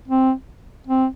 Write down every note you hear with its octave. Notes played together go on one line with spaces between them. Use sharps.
C4
C4